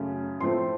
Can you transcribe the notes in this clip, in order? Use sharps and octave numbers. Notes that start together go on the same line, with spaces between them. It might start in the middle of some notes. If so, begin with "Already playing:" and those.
Already playing: F#2 C#3 A3 C#4
A2 F3 A3 C4 C6